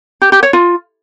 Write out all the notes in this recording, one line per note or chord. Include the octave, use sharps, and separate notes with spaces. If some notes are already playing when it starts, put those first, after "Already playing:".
G4
G4
C#5
F4